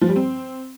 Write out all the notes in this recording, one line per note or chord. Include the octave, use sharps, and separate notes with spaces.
F3
G3
C4